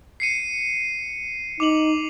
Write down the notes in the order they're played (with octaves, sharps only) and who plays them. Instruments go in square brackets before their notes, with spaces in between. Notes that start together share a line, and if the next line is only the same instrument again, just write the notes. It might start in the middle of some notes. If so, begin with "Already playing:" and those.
[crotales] C7 C#7 D#7
[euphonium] D#4 [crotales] D6 F7 F#7